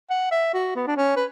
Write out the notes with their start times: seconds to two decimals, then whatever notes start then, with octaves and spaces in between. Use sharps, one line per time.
0.10 F#5
0.31 E5
0.53 F#4
0.75 B3
0.87 D4
0.97 C#4
1.16 B4